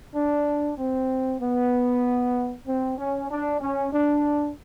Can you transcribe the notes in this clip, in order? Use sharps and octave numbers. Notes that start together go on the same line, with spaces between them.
D4
C4
B3
C4
C#4
D4
C#4
D4